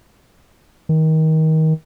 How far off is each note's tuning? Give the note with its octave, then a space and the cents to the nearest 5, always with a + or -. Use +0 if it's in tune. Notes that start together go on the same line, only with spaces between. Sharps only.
D#3 +25